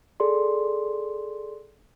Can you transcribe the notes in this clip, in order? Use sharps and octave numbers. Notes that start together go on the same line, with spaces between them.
G#4 A4 D5 C6